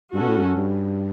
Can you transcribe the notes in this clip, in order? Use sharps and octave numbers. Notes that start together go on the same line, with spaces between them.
G2 C#4 F#4 A4
B2
A2
G2
F#2
G2